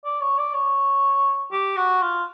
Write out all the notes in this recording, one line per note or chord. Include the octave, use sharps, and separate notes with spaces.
D5
C#5
D5
C#5
G4
F#4
F4